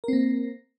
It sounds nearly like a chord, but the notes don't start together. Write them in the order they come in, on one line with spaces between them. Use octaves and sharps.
A#4 C4 A#3